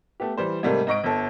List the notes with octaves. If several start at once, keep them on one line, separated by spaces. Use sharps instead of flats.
A3 B3 G4
E3 G3 C5
G#2 C3 G3 A3 A#3
G#2 D#5 C#6 D7
G1 A4